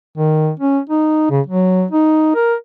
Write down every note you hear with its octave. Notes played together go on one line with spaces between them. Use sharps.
D#3
C#4
D#4
C#3
F#3
D#4
A#4